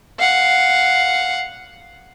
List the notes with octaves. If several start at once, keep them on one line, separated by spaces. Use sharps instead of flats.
F5 F#5